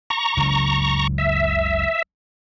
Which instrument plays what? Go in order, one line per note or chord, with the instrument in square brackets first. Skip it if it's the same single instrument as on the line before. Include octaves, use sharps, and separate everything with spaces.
[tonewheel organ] A#5 C#6
[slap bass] F#1 C#2 E3
[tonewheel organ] E5